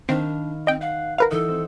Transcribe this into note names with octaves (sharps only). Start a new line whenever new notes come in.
D#3 C4 D4 F5 B5
C4 D#5 G5
F5 F#5
A#4 B4 F5
E3 D#4 A4
C4